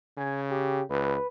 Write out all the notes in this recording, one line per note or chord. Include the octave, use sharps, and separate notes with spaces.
C#3 G#5
G4
C#2 B4